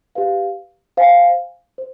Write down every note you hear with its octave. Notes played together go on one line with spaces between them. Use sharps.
G4 B4 F5
C5 F5 G#5
C5